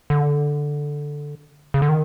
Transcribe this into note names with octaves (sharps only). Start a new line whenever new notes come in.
D3
C#3
D3
D#3